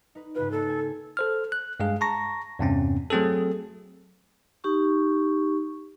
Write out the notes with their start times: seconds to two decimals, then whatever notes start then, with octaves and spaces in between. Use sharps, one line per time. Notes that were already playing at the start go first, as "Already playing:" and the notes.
0.15 D#4 B4
0.35 G#2 C#3 F4 B4
0.51 A#3 A4
0.69 G#5
1.17 A4 C5 F6
1.52 F#6
1.80 G2 G#3 G#4 F5
2.01 A5 A#5 C#6 A#6
2.59 E2 G2 C3 C4 C#4
3.10 F#3 A3 C4 G#4 A4
4.64 D#4 G4 C#6